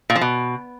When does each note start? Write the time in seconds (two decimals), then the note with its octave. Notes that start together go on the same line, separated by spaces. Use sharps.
0.10 A#2
0.16 F3
0.21 B2